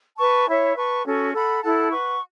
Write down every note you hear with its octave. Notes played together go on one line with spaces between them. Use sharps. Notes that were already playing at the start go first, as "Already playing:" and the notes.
B4 A5 C#6
E4 C#5 E5
B4 A5 C#6
C#4 F#4 A4
A4 F#5 B5
E4 A4 F#5 A5
B4 F#5 C#6